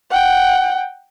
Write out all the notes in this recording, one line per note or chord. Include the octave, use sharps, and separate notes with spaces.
F#5 G5